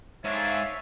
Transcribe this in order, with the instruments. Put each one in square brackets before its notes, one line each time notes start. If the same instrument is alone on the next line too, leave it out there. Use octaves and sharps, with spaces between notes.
[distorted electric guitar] G#2 [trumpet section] D4 A4 G#5 [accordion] C#5 E5 F5